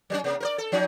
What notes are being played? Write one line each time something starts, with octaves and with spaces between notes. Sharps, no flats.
F#3 A3 C#4
C3 A#3
A#4 C5 D5
A4
F3 C#4 D#4